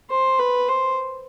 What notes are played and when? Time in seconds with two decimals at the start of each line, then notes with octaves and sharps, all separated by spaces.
0.10 C5
0.39 B4
0.69 C5